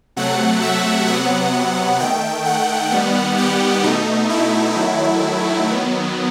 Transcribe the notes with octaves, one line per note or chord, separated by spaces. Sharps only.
C3 F#3 A3 F#5
E5
C3 F#3 B3 F#5
D#3 A3 G5
F#5
D#3 G3 B3
G4
B2 A3 D#4
E4
D#3 F#3 A3
D#3 F#3 B3